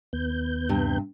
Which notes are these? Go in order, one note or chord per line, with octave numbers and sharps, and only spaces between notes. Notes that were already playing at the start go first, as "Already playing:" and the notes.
D#2 B3 G6
G2 C3